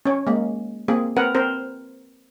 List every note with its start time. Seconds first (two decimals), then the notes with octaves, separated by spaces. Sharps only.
0.06 C#4 C#5
0.27 G#3 A#3
0.88 A#3 C4 G#4
1.16 C4 A#4 B4 F#5
1.35 C4 A#4 C5